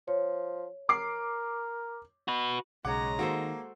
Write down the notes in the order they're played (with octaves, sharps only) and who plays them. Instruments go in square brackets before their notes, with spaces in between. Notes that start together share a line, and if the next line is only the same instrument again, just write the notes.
[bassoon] F3 [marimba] C#5
[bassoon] A#4 [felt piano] D6 C7
[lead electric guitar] F#4 B4
[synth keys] B1 C#3 C#5 [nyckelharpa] G#3 A#5 [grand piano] F#5 D6
[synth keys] D#3 [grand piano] A#3 [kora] F#4 A4 C5